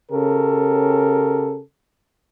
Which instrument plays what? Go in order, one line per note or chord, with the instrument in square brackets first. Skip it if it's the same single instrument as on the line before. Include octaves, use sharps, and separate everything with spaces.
[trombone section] C#3 C#4 G4 A4 A#4